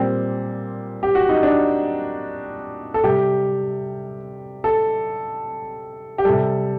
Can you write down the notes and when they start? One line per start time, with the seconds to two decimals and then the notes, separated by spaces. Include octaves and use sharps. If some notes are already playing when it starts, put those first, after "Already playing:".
Already playing: A#2 G3 C4
1.03 G4
1.15 F#4
1.29 D#4
1.43 D4
2.94 A4
3.04 C3 G3 G4
4.64 A4
6.18 G4
6.25 C3 G3 A4